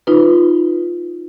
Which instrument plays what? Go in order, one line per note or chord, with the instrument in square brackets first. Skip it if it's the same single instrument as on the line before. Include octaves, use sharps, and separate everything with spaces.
[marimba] D#4 F4 B4